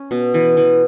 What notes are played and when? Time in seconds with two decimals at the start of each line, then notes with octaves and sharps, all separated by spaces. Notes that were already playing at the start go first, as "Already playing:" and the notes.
Already playing: C#4
0.11 B2
0.34 E3
0.57 E3